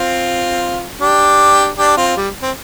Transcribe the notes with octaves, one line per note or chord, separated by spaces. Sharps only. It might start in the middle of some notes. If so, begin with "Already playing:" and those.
Already playing: C4 F4
D4 G4
D4 G4
C4 F4
G3
C4